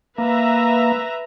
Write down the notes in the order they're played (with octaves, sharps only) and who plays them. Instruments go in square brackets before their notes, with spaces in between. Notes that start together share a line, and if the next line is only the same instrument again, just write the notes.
[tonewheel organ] A#3 [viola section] B4 E5 A#5